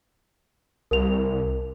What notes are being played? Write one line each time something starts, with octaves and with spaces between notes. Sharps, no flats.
C2 A#4 F7